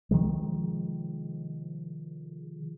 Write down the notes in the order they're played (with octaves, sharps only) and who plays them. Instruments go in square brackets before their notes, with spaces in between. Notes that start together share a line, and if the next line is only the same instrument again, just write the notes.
[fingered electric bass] C3 D#3 F3 G#3